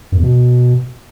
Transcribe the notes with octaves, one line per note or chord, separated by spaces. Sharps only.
F#2
E2
B2